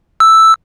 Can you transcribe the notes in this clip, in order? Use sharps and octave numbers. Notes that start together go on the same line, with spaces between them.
E6